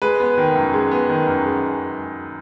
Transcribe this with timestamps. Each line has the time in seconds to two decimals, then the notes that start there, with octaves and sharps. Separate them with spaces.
0.02 G#3 B4
0.20 B3
0.38 D#3
0.55 F#2
0.73 G#3
0.91 B3
1.09 D#3
1.27 F#2
1.45 G#3